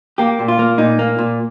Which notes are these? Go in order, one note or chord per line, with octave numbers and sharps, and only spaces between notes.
A#3 G4
A#2
F4
A#3
A#2 D#4
A#3
A#2